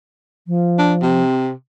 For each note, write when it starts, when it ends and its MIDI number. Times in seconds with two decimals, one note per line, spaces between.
0.47 1.22 53
0.79 0.94 62
1.02 1.51 48